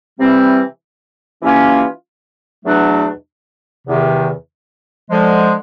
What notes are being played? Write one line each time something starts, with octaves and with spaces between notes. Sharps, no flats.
C3 E3 G3 C4
E3 G3 A#3 C#4 F4
E2 B2 F#3 A3 D4
E2 C3 D#3
D3 F3 G#3